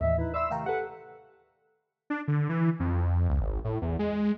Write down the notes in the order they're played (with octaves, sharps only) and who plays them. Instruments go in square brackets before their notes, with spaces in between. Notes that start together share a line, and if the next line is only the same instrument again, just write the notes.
[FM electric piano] D#2 A2 E3 [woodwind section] D#5 E5
[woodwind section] D#4 E4 B4
[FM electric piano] D5 E5 [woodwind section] B5 C6 E6
[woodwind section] C3 D#3 A3 [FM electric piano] F5 G5 A#5
[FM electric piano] G4 A4 [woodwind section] B4 F#5
[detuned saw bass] D4
D3
E3
F2
C#2
G#1
A2
E2
G#3